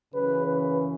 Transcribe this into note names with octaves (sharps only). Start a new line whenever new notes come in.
F#2 C#3 E3 B4
B4